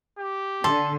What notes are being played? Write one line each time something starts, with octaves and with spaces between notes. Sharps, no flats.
G4
D3 A4 C6